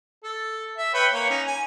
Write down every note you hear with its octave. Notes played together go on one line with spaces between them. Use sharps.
A4
E5
B4 C#5 G5
A#3 C#5
C#4 D#4
G#5